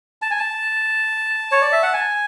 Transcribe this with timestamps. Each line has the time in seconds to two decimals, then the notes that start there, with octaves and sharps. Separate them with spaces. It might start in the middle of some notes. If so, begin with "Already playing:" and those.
0.22 A5
0.31 G#5
0.39 A5
1.52 C#5
1.62 D5
1.72 E5
1.83 F#5
1.93 G#5